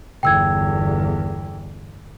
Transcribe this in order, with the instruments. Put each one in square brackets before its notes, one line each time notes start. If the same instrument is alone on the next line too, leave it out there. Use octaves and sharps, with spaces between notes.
[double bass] G1 E2 [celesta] G5 E6 G#6